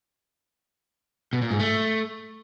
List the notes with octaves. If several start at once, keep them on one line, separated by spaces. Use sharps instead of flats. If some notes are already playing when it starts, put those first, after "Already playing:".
B2
A#2
G#2
A3